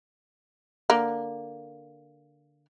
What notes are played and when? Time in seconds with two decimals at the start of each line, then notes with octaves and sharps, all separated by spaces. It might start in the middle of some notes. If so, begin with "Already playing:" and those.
0.90 D3 A#3